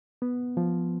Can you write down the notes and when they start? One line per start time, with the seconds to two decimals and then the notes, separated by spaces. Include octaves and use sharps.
0.22 B3
0.57 F3